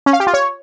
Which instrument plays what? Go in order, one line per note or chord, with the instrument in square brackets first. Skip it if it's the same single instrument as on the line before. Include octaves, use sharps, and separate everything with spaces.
[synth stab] C#4
F5
G4
F4
C#5